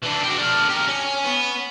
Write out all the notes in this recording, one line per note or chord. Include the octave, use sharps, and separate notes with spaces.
E3 D4
F#4 G4
D4 A#4
G4 A#4
C#4
B3